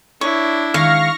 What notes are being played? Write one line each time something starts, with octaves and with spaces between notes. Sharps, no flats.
D4 E4 C#5
D#3 G#3 F5 C#6 F6 A#6